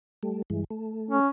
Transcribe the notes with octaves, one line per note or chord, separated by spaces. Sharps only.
G3 A3
G2 E3 G#3
A3
C#4